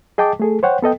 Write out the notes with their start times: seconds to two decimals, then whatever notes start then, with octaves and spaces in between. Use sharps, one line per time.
0.18 G#4 D#5 G5 A5 D6
0.40 A3 G#4 A4
0.63 C5 C#5 F#5 G5
0.82 B3 A4 D#5 G5